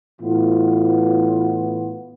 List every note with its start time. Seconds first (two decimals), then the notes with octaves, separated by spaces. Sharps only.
0.21 A2 E3 B3 F4